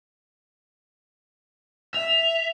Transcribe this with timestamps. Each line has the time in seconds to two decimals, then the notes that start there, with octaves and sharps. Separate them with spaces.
1.94 E5 F7